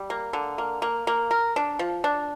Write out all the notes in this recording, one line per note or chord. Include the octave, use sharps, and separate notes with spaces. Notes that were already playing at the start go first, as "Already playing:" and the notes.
Already playing: G3
A#3
D3
A#3
A#3
A#3
A#4
D4
F3
D4